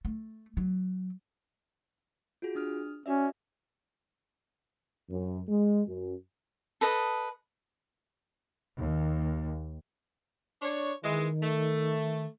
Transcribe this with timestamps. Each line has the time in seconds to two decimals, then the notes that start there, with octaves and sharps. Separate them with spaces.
0.05 A3
0.57 F#3
2.42 F4 F#4 G#4
2.55 D4 D#6 F6
3.06 C#4 F#4 D5 E5
5.10 F#2
5.49 G#3
5.87 F#2
6.81 A4 B4 D#5
8.79 D#2
10.62 D4 C#5
11.03 D#3 E3 G#3
11.43 A3